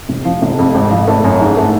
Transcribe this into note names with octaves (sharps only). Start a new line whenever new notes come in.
F1
F3
F1
F2
G#1
F3
A3
F#2
G#2
A3